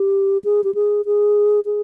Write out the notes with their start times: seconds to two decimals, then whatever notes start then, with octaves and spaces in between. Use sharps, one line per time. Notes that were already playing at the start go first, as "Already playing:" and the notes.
Already playing: G4
0.44 G#4
0.64 G4
0.74 G#4
1.05 G#4
1.65 G#4